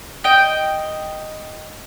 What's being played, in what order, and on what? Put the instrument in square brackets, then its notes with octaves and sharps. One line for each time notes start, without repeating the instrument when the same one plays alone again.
[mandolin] D#5 G5